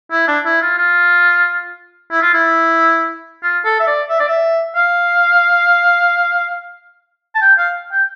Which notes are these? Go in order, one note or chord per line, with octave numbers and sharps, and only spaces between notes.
E4
D4
E4
F4
F4
E4
F4
E4
F4
A4
E5
D5
E5
D5
E5
F5
A5
G5
F5
G5